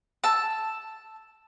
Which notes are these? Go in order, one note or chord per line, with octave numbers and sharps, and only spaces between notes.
A5 E6